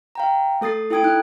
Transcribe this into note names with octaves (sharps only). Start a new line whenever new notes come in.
F5 G5 A#5
A3 A4 D#6 A6 C7
E4 A4 G5 D#6 G#6 D7
D#4 F#6